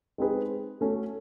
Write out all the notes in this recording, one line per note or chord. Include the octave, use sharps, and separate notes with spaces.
G#3 C4 D#4 G#4 B4
A3 C#4 F#4 A4 C#5